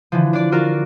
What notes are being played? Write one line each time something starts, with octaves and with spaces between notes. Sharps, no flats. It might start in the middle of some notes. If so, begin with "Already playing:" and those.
D3 E3 F3
D4 D5
F4 F#4 A#4 D5